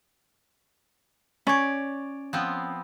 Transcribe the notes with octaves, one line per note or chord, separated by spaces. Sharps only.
C#4 C#5 D5
F3 B3 C4